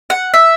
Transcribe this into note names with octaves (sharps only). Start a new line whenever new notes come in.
F#5
E5